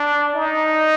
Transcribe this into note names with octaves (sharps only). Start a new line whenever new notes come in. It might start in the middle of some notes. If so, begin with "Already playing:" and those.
Already playing: D4
D#4